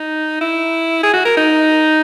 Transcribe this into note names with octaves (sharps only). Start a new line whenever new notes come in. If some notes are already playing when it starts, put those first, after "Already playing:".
Already playing: D#4
E4
G#4
F#4
A#4
D#4